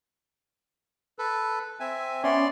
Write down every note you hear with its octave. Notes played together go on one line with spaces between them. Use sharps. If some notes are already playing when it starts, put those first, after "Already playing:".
A4 B4
C4 E5 G#5
B3 C#4 D5 E5 C6